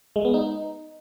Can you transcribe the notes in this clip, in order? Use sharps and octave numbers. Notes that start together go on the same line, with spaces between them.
G#3
B3
D#4